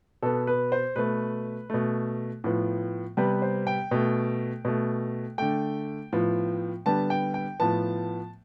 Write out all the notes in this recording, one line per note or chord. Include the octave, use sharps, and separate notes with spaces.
B2 B3 A4
B4
C5
B2 A3 B4
B2 A3
A2 F3 B3
C3 G3 B3 B4
C5
G5
B2 A3
B2 A3
D3 A3 G5
A2 F3 B3
D3 G3 B3 A5
G5
G5
A2 F3 B3 A5